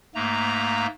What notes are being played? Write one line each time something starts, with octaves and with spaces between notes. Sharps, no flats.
G#2 A3 A#3 A#5